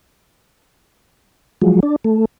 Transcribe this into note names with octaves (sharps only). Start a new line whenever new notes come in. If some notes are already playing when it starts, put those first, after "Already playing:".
F3 F#3 G#3
D4
A3